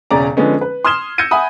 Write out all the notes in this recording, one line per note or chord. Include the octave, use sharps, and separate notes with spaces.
E1 C#3 C#4 D5 A#5
D3 F3 G#3 B3 C#4 D#4
B4
C6 D#6 F6 G#6 E7 G7
E6 G6 G#6 A#6 C#7 D#7
E5 F#5 G#5 B5 D#6